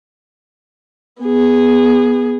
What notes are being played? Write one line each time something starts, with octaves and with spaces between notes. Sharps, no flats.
B3 G#4